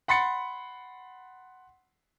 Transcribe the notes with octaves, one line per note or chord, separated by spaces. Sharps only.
F#5 B5 C6 A6 C#7